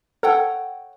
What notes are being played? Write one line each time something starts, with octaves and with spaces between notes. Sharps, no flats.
A4 C#5 F#5 G5